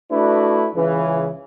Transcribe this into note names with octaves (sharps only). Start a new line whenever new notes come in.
A3 D4 E4 F#4 B4
C#2 C#3 E3